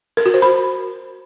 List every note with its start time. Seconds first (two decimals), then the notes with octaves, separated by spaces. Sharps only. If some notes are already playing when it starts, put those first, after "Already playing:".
0.17 A#4
0.26 F#4
0.34 C5
0.42 B5